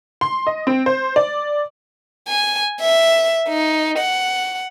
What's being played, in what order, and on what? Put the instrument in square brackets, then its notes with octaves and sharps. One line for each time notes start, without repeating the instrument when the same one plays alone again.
[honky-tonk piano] C6
D#5
C4
C5
D5
[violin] G#5
E5
D#4
F#5